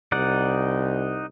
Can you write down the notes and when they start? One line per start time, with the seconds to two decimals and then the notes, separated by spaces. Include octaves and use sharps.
0.12 C2 D#4 D5 F#5